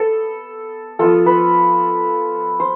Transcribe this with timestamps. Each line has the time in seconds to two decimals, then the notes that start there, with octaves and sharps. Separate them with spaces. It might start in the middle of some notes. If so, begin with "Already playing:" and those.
Already playing: B3 A4
0.99 F3 B3 F4 A4
1.26 B4
2.60 C5